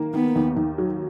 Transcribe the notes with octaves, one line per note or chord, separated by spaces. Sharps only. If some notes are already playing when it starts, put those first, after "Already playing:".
Already playing: D#3 A#3
D#3 B3
D#2
D#2
F#3